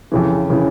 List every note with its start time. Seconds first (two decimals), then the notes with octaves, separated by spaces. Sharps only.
0.12 F2 C#3 E3
0.50 C#3 E3